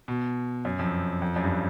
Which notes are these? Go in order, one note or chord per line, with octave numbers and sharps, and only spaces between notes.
B2
F#2
F2
F2
F#2
G2